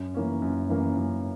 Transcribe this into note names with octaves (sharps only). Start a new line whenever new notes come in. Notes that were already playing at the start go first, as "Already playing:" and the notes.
Already playing: F#2
E3 A#3 C#4
F#2
E3 A#3 C#4
F#2